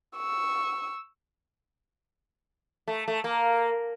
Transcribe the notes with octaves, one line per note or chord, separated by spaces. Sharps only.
C#6 E6
A3
A3
A#3